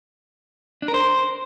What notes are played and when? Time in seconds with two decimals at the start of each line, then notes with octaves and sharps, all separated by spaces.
0.82 D4
0.88 A#4
0.94 C5